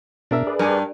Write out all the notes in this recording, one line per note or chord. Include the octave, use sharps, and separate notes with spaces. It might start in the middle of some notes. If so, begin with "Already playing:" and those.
B2 D4 A#4 E5
G#4 B4 D5
G2 A#4 G#5